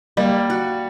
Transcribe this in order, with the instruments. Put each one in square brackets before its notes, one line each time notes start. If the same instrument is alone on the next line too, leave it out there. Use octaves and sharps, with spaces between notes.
[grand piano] G3 [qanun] A#3
[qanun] F#4